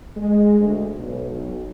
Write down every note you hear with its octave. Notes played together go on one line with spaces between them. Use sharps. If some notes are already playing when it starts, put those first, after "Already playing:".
G#3
D2
B1
B1